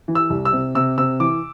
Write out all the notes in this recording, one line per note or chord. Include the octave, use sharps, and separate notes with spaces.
E3
E6
C2
E6
C3
C3 E6
C3 E6
E3 D6